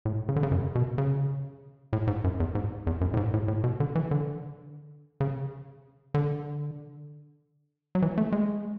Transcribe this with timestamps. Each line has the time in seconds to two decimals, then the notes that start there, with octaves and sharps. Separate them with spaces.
0.05 A2
0.29 C#3
0.36 D3
0.43 C#3
0.52 F#2
0.75 B2
0.98 C#3
1.93 A2
2.07 G#2
2.24 F#2
2.40 E2
2.55 G#2
2.87 E2
3.01 F#2
3.14 A2
3.17 G#2
3.34 A2
3.48 A2
3.64 B2
3.80 D3
3.95 E3
4.11 D3
5.20 C#3
6.14 D3
7.95 F#3
8.02 E3
8.18 A3
8.32 G#3